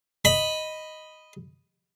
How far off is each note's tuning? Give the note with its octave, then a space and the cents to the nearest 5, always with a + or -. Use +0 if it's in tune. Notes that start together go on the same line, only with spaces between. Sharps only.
D#5 +0 B5 +0